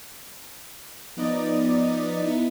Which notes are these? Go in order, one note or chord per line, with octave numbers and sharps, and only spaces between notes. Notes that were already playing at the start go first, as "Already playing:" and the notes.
F3 B3 D#4 D5 D#5
B3 D#4 E4